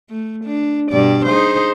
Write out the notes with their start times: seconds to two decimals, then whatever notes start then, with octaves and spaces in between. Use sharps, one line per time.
0.10 A3
0.45 D4
0.91 G2 B2 D5
1.26 D#4 G#4 C5